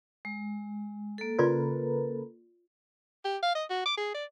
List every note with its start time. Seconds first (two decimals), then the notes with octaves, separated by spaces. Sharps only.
0.25 G#3
1.18 A#3 A4
1.39 C#3 F4 A#4 B4 D5 C6
3.25 G4
3.42 F5
3.55 D#5
3.70 F#4
3.86 D6
3.97 G#4
4.15 D5